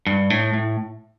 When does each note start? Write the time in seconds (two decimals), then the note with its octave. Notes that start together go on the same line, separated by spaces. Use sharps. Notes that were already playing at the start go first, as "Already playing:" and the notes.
0.07 G2
0.30 A2
0.54 A2